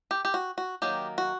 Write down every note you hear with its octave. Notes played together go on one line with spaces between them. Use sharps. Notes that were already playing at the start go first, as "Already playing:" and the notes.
G4
G4
F#4
F#4
D#3 F#3 A#3 G4
F#4